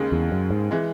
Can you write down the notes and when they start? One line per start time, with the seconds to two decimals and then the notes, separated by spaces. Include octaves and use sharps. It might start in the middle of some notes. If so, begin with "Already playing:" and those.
Already playing: D#2 C#3 G#3
0.12 E2
0.32 F#2
0.51 G#2
0.71 E3 G#3